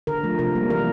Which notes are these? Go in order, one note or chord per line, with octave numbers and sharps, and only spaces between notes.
D3 A#4
F3 A3
C3 A#4
G3 A#3
E3 A#4